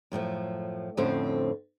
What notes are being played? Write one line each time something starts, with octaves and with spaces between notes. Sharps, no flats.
F#2 A2 D#3 F3
F2 A2 D3 C4 C#4 C5